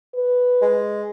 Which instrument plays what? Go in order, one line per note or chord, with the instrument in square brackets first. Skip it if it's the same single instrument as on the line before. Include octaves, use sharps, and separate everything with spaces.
[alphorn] B4
[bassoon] G#3